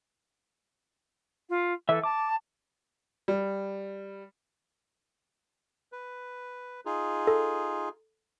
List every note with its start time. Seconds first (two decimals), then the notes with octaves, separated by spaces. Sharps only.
1.49 F4
1.89 E3 A4 E5
2.04 A5 D6
3.28 G3
5.92 B4
6.86 D#4 F4 G#4
7.27 A4